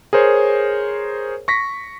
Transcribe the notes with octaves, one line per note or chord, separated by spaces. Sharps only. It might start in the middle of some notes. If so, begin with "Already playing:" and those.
G#4 A#4 C5 C#5
C#6 A#6 B6